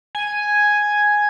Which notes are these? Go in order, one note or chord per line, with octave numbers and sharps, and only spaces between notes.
G#5